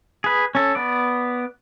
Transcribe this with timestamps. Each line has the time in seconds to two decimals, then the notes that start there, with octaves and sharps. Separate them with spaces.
0.24 G#4 B4
0.55 C#4 A4
0.75 B3 D5